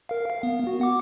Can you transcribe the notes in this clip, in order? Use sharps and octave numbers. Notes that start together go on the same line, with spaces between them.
A#4 F5
F5
B3
B3 F#4
F#5 D6